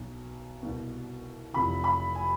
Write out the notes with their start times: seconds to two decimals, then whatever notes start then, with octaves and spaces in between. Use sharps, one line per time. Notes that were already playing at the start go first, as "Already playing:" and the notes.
Already playing: B1 B2
0.63 C2 B2
1.53 F1 F2 C3 E3 B5
1.84 B5
2.15 G#5